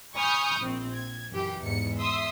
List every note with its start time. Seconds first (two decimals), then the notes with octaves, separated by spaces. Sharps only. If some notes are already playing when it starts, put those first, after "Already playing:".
0.17 G#5 B5 C#6 D#6 F6 G6
0.59 A#1 C4
0.95 G#6
1.30 F#2 E3 G4
1.60 E2 G#2 C#7
1.99 E5 C6 D#6 E6